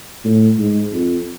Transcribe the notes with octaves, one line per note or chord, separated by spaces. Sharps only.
A2
G#2
F2